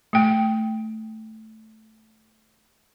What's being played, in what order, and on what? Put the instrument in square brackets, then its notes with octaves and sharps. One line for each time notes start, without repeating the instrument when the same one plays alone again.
[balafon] A3 G5